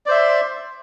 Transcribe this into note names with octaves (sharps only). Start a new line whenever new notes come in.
C5 D5 E5 C6